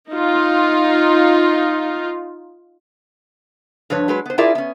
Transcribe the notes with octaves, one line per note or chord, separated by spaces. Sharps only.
D#4 F4
G2 F3 B4 C#5
F#3 G#3 B4
B3 C5
E4 F4 G#4 A#4 D5 E5
B3 C#4